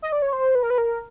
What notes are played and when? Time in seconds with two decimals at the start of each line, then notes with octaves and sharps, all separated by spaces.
0.02 D#5
0.12 D5
0.22 C#5
0.33 C5
0.55 B4
0.63 A#4
0.70 B4
0.78 A#4